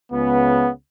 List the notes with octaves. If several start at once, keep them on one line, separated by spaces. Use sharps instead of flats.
C#2 C#3 B3